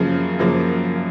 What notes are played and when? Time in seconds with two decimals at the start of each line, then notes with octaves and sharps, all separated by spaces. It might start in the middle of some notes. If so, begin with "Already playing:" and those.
Already playing: F#2 C#3 F3 A#3
0.39 F#2 C#3 F3 A#3